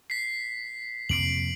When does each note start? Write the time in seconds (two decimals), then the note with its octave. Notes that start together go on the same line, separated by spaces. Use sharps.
0.10 B6 C7
1.09 F2 C3 A#3 C7 D7 F#7